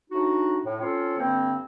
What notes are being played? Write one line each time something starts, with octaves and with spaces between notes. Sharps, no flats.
A2 D4 D#4 F#4
A2
C4 C#4 F4 A4 C#5
G2 D3 A#3 C4